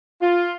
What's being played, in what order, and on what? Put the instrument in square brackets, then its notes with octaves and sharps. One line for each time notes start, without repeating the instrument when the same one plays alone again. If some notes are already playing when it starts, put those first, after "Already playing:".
[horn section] F4